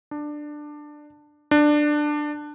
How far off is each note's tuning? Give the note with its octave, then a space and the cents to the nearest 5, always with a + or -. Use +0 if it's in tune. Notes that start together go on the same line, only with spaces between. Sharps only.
D4 +15
D4 +15